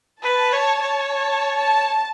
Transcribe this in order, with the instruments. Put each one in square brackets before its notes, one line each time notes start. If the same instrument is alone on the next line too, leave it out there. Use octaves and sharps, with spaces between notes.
[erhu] B4 [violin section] A5
[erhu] C#5
C#5
[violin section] A5
A5